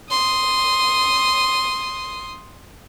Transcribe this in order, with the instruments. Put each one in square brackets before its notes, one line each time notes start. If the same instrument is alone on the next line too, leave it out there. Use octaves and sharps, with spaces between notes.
[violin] C6 D#6